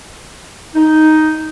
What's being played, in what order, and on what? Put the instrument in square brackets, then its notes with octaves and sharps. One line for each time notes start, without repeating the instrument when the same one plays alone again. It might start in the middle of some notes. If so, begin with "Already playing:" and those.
[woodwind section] D#4